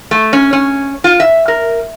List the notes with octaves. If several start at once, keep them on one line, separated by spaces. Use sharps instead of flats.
A3
C#4
C#4
F4
E5
A#4